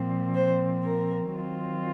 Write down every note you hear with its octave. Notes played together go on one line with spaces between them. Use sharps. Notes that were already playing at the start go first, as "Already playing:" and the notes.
Already playing: A#2 F3 C4
C5
A#4
D#3 F#3 C4 F4